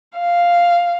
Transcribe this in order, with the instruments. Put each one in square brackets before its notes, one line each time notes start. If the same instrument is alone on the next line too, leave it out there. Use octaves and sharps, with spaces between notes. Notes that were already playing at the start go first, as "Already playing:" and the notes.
[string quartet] F5